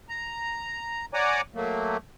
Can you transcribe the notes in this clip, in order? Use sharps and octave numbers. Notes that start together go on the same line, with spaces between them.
A#5
C#5 D5 F#5 G#5 A#5 D6
F#3 A3 A#3